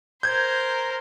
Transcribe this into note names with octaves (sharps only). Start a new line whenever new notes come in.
A#4 C5 G6 G#6